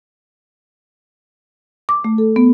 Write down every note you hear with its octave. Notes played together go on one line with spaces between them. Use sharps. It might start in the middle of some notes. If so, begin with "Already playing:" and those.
D6
A3
A4
B3